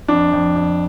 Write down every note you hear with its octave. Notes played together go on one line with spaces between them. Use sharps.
F2 D4
F2
F2